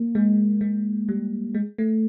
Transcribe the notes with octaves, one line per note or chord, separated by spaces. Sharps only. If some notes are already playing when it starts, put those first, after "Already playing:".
Already playing: A#3
G#3
G#3
G3
G#3
A3